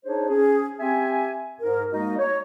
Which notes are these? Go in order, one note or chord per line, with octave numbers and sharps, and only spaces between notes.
D4 D#4 G#4 C5 C#5
C#4 G#4
C4 G4 E5 G#5
G#2 A#4
G#3 A#3 D#4 F#4 D#5
C#5